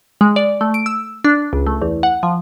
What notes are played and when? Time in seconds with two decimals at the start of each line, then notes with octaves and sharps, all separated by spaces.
0.21 G#3
0.36 D5
0.61 A3
0.74 D7
0.86 E6
1.25 D4
1.53 C#2
1.67 A3
1.82 E2
2.03 F#5
2.23 F3